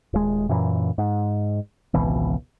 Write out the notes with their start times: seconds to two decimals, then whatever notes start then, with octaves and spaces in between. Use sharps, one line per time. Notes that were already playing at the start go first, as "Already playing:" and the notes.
0.13 D#1 G#3
0.49 F#2 A#2 E3
0.98 G#2
1.94 G#1 C#2 B2 E3